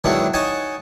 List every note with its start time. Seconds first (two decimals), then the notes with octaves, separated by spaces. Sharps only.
0.04 D#3 F#3 G#3 B3 D4 E4
0.34 D#4 C#5 F#5 G#5 A5